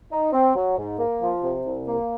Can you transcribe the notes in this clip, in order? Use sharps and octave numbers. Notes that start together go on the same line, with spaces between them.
D#4
C4
F#3
G#2
A#3
F3
C3
C2
A#3